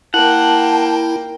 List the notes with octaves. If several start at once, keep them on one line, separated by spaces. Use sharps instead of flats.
A#3 E4 F#5 G5 A5